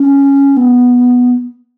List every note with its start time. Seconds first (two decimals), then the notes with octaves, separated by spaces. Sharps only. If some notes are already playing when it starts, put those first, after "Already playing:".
Already playing: C#4
0.56 B3